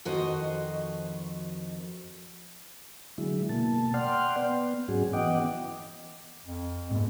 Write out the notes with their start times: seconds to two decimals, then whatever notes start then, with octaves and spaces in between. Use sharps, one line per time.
0.05 F2 D#3 F#4 C5 D#5
3.18 D3 F#3 G#3 E4
3.49 B2 A#3 A5
3.94 D5 F#5 G5 C6 F6
4.36 B3
4.88 G#2 F#3 C#4 F#4 G#4
5.13 E3 B3 D#5 F#5 G5 D6
6.45 F2
6.91 G#2 G#3 B3